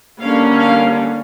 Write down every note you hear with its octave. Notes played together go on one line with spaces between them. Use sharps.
D3 G3 A#3 C#4 F5
F5